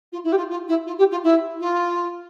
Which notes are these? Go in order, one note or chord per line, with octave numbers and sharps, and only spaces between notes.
F4
E4
G4
F4
F4
E4
F4
G4
F4
E4
F4